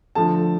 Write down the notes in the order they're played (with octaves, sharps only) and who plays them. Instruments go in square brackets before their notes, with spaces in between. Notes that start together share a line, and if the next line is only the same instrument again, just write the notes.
[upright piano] D3 F3 A3 A5